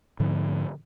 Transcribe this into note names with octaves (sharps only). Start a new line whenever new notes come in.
G#2 D3 F3 B3